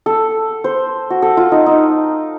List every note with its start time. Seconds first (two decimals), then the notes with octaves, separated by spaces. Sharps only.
0.06 A4
0.64 C5
1.10 F#4
1.22 A4
1.37 F4
1.52 D#4
1.66 D#4